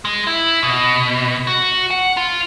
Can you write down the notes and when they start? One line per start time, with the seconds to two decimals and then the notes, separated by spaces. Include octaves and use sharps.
0.05 G#3
0.27 E4
0.63 B2
1.47 F#4
1.91 F#5
2.17 F4